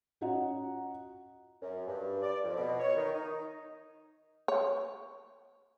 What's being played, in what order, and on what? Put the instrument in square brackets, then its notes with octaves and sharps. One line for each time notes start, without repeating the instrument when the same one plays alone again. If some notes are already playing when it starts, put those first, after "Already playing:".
[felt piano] C#4 F4 F#4 D#5 F#5 A#5
[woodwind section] F#2
G2
D5
F2
B2
C#5
D#3
D#4
[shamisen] C#5